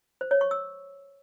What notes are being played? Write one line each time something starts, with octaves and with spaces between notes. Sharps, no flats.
C5
C#5
C#6
E6